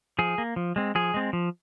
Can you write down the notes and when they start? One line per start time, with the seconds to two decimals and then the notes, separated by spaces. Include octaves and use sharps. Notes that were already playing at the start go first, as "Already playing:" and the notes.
0.19 F3 G#4
0.38 A#3
0.56 F3
0.76 G#3 C4
0.95 F3 G#4
1.14 G#3 C4
1.33 F3